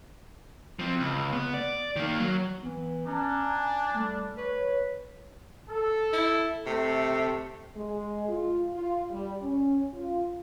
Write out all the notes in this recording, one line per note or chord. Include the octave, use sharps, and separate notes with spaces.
F3 C4
C#2
B3
D5
D#3 A#3
F#3
E3 B3
C#4 D4 A#5
G#5
G3 A3
B4 C#5
A4
E4
C3 A3
G#3
F4
F4
G3
C#4
F4